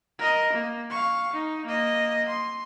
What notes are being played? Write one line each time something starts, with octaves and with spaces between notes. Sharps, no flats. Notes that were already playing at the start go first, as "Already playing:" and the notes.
A#4 D#5
A#3
F5 C#6
D#4
A#3 D#5
C6